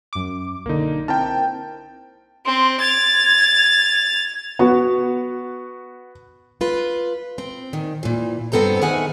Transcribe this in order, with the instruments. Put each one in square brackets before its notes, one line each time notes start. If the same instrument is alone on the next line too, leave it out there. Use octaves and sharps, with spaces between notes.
[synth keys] F#2 D6
[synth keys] B1 D3 [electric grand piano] A#3 D#4
[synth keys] C4 E4 A#4 [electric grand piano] G5 A5
[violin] C4 [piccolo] C6
[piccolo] G#6 [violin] A6 F7
[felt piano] B3 F#4
[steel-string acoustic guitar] F4 B4
C4
A#2 D#3
A#2 E3
G2 B3 C4 A4 C5 A#5
D#3 G#4 E5 F#5 G#5